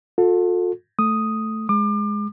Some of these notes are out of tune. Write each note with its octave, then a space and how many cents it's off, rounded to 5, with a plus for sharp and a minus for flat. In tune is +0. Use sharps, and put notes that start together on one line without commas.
F4 +45 A4 +10
A3 +0 D#6 +0
G#3 +0 D6 +35